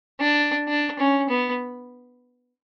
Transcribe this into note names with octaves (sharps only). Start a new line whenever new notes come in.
D4
D4
C#4
B3